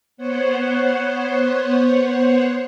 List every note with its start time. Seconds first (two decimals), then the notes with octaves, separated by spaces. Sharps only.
0.17 B3 C5 C#5 F#5